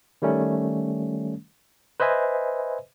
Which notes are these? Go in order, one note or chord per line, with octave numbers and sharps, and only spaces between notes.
D#3 G3 A3 C#4
B4 C5 D#5 E5 G#5